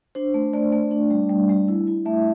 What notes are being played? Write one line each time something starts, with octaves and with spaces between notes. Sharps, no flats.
D4 C5
A3
A3 D5
A3
D4
G3
G3
G3
E4
E4
A3 E5